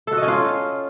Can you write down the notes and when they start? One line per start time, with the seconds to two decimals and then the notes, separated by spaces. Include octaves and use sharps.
0.07 A4
0.12 F#4
0.18 D#5
0.23 C#4
0.28 F4